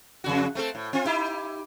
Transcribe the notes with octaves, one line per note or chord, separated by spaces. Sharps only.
F2 C#3 F#4
A3 C4 A4
A2
C4 F4
D#4 E4 G4